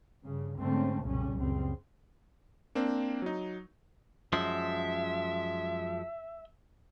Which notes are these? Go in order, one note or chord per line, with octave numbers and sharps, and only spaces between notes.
G2 C#3
G#2 D3 A3 C4 C#4
B1 F2 A#2 C#3 G3 C#4
C#2 F#2 C#3 G3 C4
A#3 C4 D4
F#3 D#4
F#2 F3 G#3 E5